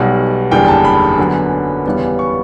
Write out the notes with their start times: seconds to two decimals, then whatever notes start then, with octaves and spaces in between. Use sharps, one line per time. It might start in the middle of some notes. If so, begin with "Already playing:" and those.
Already playing: B1 B2 G3 F#5
0.51 F#1 E2 D3 G3 G5
0.68 A5
0.85 B5
1.19 F#2 D3 F#3 B3
1.86 E2 C#3 E3 G3 B3
2.19 C#6